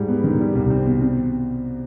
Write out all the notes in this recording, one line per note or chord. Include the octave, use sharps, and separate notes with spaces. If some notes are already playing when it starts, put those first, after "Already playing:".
Already playing: G#2 G3
B3
D#3
G3
C2
C4
B2
C4